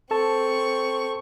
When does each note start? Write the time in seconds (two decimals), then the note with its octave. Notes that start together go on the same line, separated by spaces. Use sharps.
0.11 C4 A4 A5 C#6